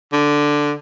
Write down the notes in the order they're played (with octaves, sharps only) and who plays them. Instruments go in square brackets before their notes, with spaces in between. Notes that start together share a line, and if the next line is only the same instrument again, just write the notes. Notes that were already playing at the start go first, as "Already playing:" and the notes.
[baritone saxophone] D3